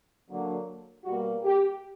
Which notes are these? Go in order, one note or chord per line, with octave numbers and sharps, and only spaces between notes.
D3 F#3 A#3
B2 G3 A#3 F#4
G4